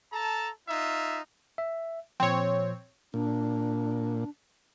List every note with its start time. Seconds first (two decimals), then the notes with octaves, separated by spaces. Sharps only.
0.12 A4 A5 A#5
0.66 D#4 F4 E5
1.58 E5
2.20 A#2 F3 C4 C#5
3.14 A#2 D4